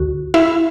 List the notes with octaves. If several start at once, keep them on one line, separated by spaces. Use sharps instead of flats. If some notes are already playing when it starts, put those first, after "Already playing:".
Already playing: D2 D3 F#4
E4 E5